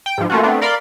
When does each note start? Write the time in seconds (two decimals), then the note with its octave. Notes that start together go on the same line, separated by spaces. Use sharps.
0.06 G5
0.18 G#2 F3
0.30 A3 A#3 C#4 F4 F#4
0.43 A3 B3 C4 D4
0.61 A#4 D5 F5 B5 C6